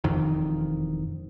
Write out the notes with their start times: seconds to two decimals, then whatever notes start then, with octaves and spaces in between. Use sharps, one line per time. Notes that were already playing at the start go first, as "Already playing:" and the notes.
0.04 E1 F2 D#3